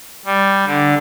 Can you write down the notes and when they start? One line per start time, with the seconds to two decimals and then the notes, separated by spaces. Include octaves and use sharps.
0.25 G3
0.66 D3